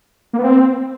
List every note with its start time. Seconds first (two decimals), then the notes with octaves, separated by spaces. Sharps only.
0.33 A#3
0.39 B3
0.44 C4